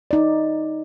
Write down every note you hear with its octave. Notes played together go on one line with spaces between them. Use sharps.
D#4 D5